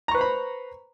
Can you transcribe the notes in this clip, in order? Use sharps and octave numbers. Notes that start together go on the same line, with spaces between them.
B4 C5 A#5 B5 C#6